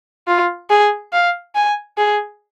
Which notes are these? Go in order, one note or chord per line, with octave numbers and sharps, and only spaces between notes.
F4
G#4
F5
G#5
G#4